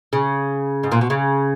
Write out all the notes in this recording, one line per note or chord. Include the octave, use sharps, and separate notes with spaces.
C#3
G#2
A#2
B2
C#3